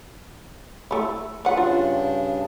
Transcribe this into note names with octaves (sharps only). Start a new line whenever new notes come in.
A3 E4
F3 D4 B4 F#5
G2 C#3 D4 F4